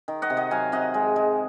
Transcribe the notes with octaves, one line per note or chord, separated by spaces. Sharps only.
D#3
D#5 F#5
C3
D#5 F#5
F#3 F5 G#5
C3 D#5 F#5
G#3
G#3